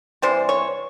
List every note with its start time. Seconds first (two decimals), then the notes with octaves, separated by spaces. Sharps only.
0.22 C3 E3 G3 C5
0.49 C#5